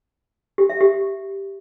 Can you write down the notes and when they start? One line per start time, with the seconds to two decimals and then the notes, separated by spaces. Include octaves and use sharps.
0.58 G4
0.69 E5
0.81 G4